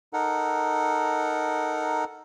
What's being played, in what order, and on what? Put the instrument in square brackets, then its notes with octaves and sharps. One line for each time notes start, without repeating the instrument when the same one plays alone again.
[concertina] D#4 A4 A#4 F#5